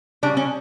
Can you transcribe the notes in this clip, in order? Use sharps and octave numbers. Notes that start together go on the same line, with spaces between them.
C#3 G3 D4
C#4